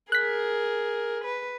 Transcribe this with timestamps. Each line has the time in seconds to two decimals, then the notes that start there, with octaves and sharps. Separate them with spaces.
0.12 G#4 A#4 F#6 B6
1.24 B4